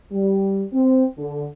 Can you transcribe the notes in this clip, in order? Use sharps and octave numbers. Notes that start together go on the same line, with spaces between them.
G3
C4
D3